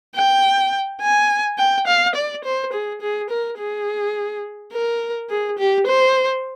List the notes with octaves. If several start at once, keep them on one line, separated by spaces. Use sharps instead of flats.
G5
G#5
G5
F5
D5
C5
G#4
G#4
A#4
G#4
A#4
G#4
G4
C5